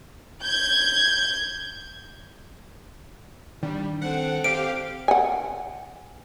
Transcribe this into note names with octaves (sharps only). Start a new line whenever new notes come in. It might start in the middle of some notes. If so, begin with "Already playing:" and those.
G6 G#6
D#3 G3 D4
C4 A4 F#5
G4 C5 D5 F5 D7
F#5 G#5